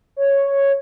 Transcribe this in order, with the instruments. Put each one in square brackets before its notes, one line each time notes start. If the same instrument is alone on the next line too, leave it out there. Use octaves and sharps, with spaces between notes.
[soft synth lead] C#5